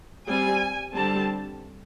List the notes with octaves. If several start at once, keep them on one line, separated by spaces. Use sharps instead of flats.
G3 C4 G#5
D3 G3 C4 A5